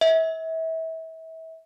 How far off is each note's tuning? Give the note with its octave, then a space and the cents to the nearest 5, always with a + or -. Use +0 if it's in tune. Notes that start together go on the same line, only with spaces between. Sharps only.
E5 -30